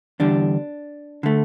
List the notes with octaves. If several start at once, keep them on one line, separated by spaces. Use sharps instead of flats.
E2 D3 G3 D4
D3 A3